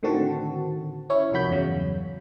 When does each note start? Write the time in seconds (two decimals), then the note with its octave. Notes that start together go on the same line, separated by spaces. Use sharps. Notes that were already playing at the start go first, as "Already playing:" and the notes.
0.03 A2 D3 D#3 C4 F#4 A5
1.10 C#4 E4 C#5
1.32 C2 F2 D#3 F#4 B5 G6
1.49 E2 G2 C#3 F#3